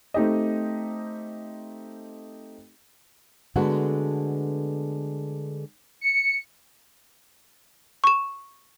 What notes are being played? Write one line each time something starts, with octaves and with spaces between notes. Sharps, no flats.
A3 C4 D#4 G4 D#5
D3 G#3 A3 B3 D4 F#4
C#7
C#6 E7